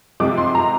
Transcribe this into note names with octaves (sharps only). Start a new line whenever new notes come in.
C3 F3 G#3 D6
C6
A#5